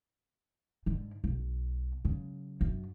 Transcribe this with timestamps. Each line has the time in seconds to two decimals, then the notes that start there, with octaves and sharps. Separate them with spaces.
0.86 G#2 D3
1.24 B1
2.05 C#3 F#3
2.61 F#2 D4